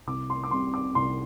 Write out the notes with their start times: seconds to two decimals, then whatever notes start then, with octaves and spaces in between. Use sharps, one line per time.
0.07 C2 D6
0.30 C6
0.44 D6
0.51 C3 G3 C4 C6
0.74 D6
0.95 C2 C6